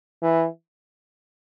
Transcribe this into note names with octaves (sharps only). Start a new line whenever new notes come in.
E3